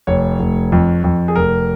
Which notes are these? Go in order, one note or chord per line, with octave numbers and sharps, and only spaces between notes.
F1 C#5
F1
F2
F2
G#4
F1 A#4